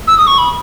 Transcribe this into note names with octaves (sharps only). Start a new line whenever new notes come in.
E6
D#6
C#6
B5